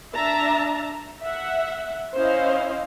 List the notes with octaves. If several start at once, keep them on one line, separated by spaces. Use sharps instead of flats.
D4 E5 A5 A#5
E5 F#5
C#4 E4 C5 D#5 F5